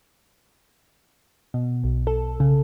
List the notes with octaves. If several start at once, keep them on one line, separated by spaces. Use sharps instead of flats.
B2
B1
A4
C#3